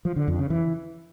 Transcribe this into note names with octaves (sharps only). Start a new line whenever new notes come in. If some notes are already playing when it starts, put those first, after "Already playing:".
F3
D3
F2
C#3
E3